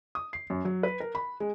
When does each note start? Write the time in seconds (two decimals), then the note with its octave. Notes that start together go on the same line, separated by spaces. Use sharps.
0.15 D#6
0.33 C7
0.50 F#2
0.65 F#3
0.83 B4
1.00 A#4
1.15 B5
1.40 G#3